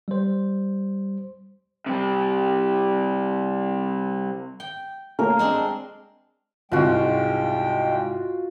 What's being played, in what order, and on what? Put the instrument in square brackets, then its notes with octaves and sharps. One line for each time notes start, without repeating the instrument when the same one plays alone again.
[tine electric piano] G3 C5
[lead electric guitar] C3 G3
[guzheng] G5
[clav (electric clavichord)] A3 A#3 C#4 [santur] A#4
[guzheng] G#3 C4 D4
[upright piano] C2 G#2 [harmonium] G#3 G5 [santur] F4 F#4